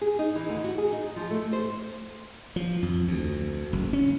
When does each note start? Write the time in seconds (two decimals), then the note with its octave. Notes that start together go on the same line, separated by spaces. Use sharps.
0.01 G#4
0.19 D#4
0.36 E3
0.48 D2
0.64 F#4
0.78 G#4
0.93 D#4
1.16 F3
1.31 A3
1.53 C5
2.56 F3
2.83 F2
3.08 D2
3.73 F#1
3.93 C#4